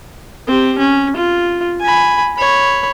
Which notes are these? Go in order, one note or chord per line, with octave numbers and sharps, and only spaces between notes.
C4 G4
C#4
F4
G#5 B5
C#5 B5